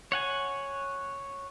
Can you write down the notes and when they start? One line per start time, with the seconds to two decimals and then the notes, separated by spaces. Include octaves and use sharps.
0.12 C#5 F#5 G#5